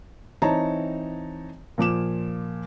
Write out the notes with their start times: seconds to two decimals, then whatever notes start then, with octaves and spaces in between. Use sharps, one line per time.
0.42 E3 C4 D#4 C#5 A5 A#5
1.78 A#2 F3 D6 E7